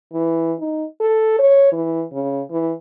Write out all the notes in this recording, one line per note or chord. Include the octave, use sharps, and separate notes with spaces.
E3
D#4
A4
C#5
E3
C#3
E3